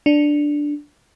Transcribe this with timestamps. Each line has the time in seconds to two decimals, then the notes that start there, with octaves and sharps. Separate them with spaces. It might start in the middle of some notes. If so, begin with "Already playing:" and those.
0.06 D4